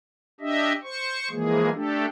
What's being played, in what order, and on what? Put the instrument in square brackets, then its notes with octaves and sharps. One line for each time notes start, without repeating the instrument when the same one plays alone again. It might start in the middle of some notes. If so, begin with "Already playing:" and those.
[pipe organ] D4 G4 D#5 E5
C5 C#6
E3 F3 G#3 A#3 G#4
A3 D4 G4 A4